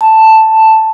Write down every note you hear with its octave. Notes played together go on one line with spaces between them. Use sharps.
A5